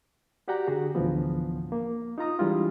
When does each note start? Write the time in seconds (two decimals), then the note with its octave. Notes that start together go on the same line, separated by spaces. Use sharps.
0.48 F#4 G4 D5 F#5 G5 A#5
0.67 D3 F#4 G#4
0.95 D2 A2 E3 F3 B3
1.72 A#3
2.18 D#4 F4 A#5 D#6
2.39 E3 G3 G#3 D4 E4 F4